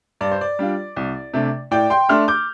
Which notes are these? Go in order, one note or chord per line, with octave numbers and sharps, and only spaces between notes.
G2 D5
C5
D5
G3 D4 F4
C2
C3 A3 D4
A2 D5 G5
G5 C6
A3 D4 C6 F6
D6 G6